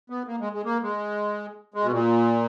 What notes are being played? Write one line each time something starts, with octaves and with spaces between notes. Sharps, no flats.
B3
A#3
G#3
G#3
A#3
G#3
G#3
B2
A#2